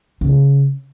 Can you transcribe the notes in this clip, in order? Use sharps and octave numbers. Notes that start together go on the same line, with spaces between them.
C#3